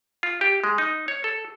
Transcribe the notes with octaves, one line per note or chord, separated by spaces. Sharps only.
F4
G4
G#3
D#4
C#5
A4